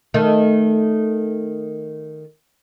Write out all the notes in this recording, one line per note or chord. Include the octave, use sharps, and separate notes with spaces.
D#3 A3